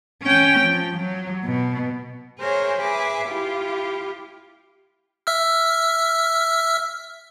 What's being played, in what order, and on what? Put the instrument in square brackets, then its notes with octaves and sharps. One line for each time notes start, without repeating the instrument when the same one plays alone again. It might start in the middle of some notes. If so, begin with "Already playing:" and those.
[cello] C#4 G5
F3
F#3
B2
[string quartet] G#4 A#4 C5 C#5 E5
G#4 B4 E5 D6
E4 F4 G4
[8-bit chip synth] E5 E6 F6